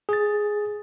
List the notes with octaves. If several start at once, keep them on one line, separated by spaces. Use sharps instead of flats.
G#4 A6